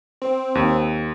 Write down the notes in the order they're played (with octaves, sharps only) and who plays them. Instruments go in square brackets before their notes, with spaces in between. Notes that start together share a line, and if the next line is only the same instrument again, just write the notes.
[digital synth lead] C4
[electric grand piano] D#2